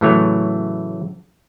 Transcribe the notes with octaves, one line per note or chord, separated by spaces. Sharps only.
A2 C#3 E3 F#3 A3 C#5